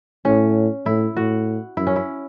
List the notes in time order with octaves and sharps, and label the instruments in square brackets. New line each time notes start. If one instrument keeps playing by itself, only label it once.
[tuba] A2 [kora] C#4
[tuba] A2 [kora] E4
[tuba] A2 [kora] F#4
[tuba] F#2 [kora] E4
[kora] C#4
E4